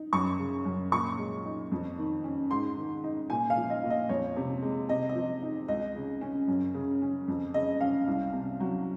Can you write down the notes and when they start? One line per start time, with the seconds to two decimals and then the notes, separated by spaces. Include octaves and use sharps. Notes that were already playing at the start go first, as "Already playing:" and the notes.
Already playing: D#4
0.13 F#2 C#6
0.39 C#3
0.65 F#2
0.91 A#2 C#6
1.18 G#3
1.45 D#4
1.72 F2
1.98 D#3
2.24 C#4
2.51 G#2 C6
2.77 D#3
3.04 D#4
3.30 A#2 G#5
3.50 F5
3.57 F3
3.70 D#5
3.84 A#2
3.90 D#5
4.09 F2 C#5
4.37 C3
4.62 G#3
4.89 C3 D#5
5.09 D#5
5.15 F3
5.42 D#4
5.68 C#2 D#5
5.96 C#3
6.21 C#4
6.48 F#2
6.74 C#3
7.02 C#4
7.28 F2
7.54 C#3 D#5
7.81 C#4 F5
8.08 C2
8.33 C3
8.60 F#3